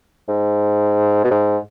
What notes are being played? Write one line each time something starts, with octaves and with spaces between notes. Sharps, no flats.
G#2
B2
G#2